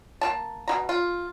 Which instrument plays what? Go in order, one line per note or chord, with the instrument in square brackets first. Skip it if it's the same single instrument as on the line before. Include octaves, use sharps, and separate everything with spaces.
[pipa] A#3 F4 A5
B2 E4 A#5
F4